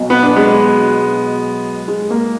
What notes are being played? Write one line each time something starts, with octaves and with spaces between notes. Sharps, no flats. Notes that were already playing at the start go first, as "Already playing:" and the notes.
Already playing: B1 B2 F#3
B3
D4
G#3 B3
G#3
A#3